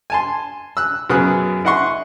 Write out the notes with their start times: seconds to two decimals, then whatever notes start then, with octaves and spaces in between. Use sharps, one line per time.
0.10 G#5 A5 C6
0.77 E6 F#6
1.10 F#2 C#3 B3 D#6 F#6
1.65 E4 D#5 F#5 C6 C#6